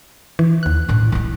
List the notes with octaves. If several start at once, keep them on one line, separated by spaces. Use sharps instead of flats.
E3
D#2 F#6
A2 D4
E3 D#4